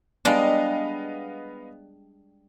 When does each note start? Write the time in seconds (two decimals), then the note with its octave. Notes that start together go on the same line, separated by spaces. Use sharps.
0.25 G3 G#3 B3 D4 D#5 F5